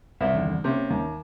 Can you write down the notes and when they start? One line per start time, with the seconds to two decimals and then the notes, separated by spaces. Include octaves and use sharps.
0.21 C2 A#4 C#5 E5
0.33 E2 D3 D#3
0.64 C3 A#3 C#4 E4
0.90 D#2